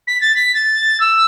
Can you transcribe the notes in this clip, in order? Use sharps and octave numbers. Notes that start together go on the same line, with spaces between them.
B6
A6
B6
A6
E6